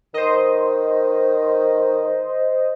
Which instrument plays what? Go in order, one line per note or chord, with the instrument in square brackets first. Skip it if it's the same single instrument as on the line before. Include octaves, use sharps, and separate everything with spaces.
[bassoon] D#3 [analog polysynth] C5 D#5